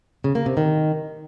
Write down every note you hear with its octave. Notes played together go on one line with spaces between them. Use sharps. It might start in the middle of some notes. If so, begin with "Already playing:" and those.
C#3
A#3
C3
D#3